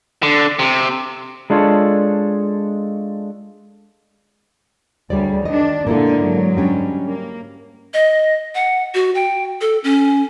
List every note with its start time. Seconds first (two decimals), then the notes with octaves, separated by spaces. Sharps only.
0.23 D3
0.59 C3
1.50 G#3 D4 F4 A4 C#5
5.10 D2 G3 G#4 C#5 D5
5.45 D#3 D4 D#5
5.87 A#2 D3 G#3 A#3 E4 A4
6.18 G#2 F#3
6.57 G3 C#4 D4
7.07 A#3
7.94 D#5
8.55 F#5
8.94 F#4
9.15 G5
9.61 A4
9.84 C#4